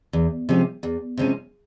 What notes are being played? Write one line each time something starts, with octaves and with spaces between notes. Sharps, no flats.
E2
C3 F3 G#3 C#4
E2
C3 F3 G#3 C#4